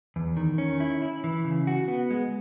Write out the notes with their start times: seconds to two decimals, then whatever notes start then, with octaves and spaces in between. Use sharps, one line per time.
0.16 E2
0.37 D#3
0.58 C#4
0.80 E4
1.02 E4
1.24 E3
1.45 C#3
1.67 F#4
1.88 B3
2.10 G#3